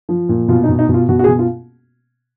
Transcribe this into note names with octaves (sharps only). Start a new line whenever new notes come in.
F3
A#2
B2 F4
D#4
B2
D#4
B2
F4
B2 F#4
F#4
G#4
B2
F4